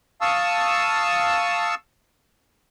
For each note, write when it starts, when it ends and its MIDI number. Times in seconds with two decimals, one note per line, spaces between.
0.21 1.75 77
0.21 1.75 81
0.21 1.75 85
0.21 1.75 87
0.21 1.75 88